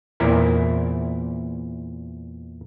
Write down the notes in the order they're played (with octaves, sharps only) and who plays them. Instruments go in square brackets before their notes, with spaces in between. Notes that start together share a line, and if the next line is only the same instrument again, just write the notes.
[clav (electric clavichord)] E2 A#2 C4 E4 A#4